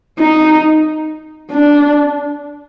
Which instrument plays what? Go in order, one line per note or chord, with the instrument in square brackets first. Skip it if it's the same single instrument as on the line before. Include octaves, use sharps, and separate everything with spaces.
[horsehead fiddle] D#4
D4